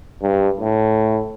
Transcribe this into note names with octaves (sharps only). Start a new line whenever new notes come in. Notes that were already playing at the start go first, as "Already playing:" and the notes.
G2
A2